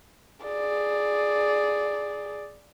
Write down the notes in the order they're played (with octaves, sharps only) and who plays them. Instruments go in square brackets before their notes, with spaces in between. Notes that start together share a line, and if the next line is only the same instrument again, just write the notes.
[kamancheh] G#4 D5